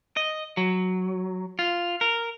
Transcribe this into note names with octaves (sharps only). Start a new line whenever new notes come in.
D#5
F#3
F4
A#4